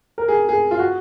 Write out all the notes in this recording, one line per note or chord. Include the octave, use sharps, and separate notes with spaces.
A#4
G#4
G#4
F4
F#4